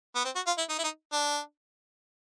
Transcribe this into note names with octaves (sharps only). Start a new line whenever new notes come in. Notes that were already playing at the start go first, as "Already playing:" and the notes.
B3
C4
F#4
F4
E4
D#4
E4
D#4
D4